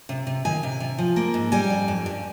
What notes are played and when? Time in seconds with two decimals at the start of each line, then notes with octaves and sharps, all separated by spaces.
0.09 C3
0.27 C3
0.45 D#3 G#5
0.63 C3
0.80 C3
0.98 F3
1.16 A#3
1.34 G#2
1.52 G3 G#5
1.70 F2
1.88 F2
2.06 G2